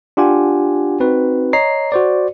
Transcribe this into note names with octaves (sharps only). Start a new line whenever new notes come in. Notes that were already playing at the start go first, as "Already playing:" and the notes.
D4 F4 G4 F#5 G#5
C4 D#4 F#4 B4
C#5 D#5 A#5 C7
F#4 C5 D5